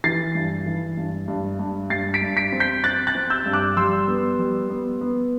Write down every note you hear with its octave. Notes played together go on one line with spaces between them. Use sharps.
E3 A6 C7
G2
E3
G2
G2
G2
G2 A6 C7
B6 D7
G2
B6 D7
C4
G6 B6
C4 F#6 A6
F#6 A6
C4
E6 G6
G2
D6 F#6
G3 C6 E6
B3
G3
B3
B3